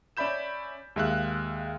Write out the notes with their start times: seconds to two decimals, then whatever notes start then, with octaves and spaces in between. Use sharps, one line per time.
0.17 C#4 D5 E5 B5 G6 E7
0.96 D#2 G#3 E5 F5 F#6